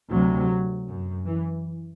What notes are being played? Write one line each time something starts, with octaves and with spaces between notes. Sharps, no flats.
D2 C3 F#3
F#2
E3